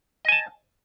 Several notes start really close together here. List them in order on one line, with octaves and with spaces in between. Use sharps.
D#5 G#5 A5